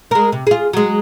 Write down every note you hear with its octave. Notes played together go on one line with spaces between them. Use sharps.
G#3 A#4
C3
F4 G#4
F#3 G#3